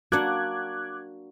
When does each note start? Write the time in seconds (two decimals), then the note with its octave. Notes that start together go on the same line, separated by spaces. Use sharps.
0.12 A#3 D4 F#4 F#5 D6 F#6 G#6